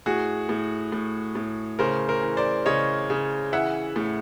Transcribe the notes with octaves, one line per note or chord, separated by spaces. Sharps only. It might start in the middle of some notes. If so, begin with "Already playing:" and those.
A2 F#4 G#4
A2
A2
A2
C#3 A#4 C5
A#4 C5
E3
C5 D5
C#3 C#5 D#5
C#3
E3 E5 F#5
A2